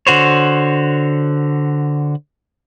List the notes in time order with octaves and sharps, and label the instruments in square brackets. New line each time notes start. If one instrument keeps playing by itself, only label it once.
[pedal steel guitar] D3 F#4 C5 C#5